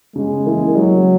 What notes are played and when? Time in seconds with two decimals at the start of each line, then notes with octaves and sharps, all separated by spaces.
0.16 C#3 G#3
0.46 E3 A#3 E4
0.76 C#3 F#3